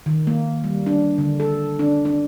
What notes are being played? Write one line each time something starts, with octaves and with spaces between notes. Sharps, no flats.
D#3
A#3
G3
D4
D3
A4
D4
D4